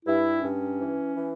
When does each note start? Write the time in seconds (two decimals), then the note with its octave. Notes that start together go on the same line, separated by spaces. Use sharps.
0.06 G2 E4
0.42 G2 C#4
0.79 E3
1.17 E3